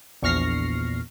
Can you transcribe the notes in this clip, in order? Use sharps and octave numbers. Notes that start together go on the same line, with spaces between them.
A#1 E2 C#6 F6 A#6 C7